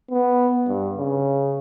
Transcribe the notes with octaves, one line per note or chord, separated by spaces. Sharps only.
B3
G2
C#3